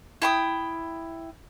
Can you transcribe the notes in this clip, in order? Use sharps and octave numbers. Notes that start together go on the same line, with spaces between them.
E4 G5 D#6